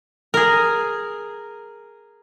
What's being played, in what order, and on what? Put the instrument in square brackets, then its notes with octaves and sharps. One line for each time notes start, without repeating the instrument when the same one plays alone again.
[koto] G#4 A#4